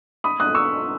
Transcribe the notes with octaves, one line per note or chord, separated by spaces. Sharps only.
B5 D#6
D#6 F#6
C#6 E6